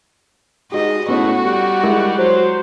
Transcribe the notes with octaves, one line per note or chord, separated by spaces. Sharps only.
G#2 F#4 G4 D#5
A2 B3 C#4 F#4 C#5
G3
G#3 E4 A#4
F#3 C5